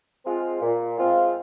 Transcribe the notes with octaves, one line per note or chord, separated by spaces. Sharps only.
G#3 C4 F4
A#2
G#3 C4 F4